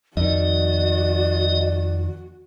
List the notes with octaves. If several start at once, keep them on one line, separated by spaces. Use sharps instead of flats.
F2 D#3 F#4 D5 D#5